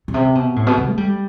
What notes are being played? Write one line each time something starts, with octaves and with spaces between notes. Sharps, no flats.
B2
C3
B2
A2
B2
C3
A3
G3